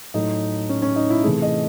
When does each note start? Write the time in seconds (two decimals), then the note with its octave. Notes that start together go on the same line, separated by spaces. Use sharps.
0.14 A2 F#3 A3 D#4
0.69 C#4
0.82 C#4
0.96 D#4
1.10 E4
1.23 C3 E3 A3 G#4
1.42 D#5